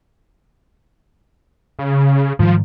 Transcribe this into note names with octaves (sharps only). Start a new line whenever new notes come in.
C#3
G#2 D#3 F3 G3